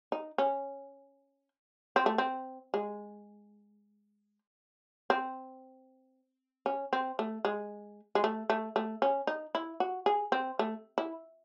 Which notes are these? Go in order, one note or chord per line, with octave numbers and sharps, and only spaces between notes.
D#4
C#4
C4
A3
C4
G#3
C4
C#4
C4
A3
G#3
G#3
A3
A3
A3
C#4
D#4
E4
F#4
G#4
C4
A3
E4